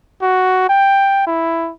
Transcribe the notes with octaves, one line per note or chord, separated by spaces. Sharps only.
F#4
G5
E4